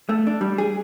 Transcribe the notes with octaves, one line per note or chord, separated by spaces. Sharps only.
A3
D4
G3
G#4